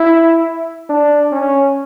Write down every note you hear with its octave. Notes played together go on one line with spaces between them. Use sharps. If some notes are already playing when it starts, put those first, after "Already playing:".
Already playing: E4
D4
C#4